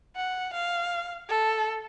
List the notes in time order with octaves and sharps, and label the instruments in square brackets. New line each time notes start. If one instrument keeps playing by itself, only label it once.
[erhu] F#5
F5
A4